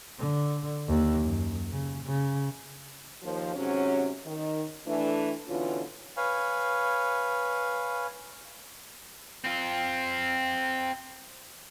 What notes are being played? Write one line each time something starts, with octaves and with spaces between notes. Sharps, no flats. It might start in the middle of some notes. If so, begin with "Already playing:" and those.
D3
D#2
F#2
C#3
C#3
D#2 F3
G#2 C3 F#3 C#4
D#3
E3 A3 D4
B2 D3 E3 C#4 F4
B4 C#5 F5 G#5
C4 F4